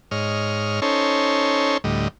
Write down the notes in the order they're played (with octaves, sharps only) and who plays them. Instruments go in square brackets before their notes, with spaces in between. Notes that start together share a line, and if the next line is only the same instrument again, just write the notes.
[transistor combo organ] G#2 C#5 D#5 F6
C#4 D#4 A4 C5 C#5
D2 A2 G3 D#5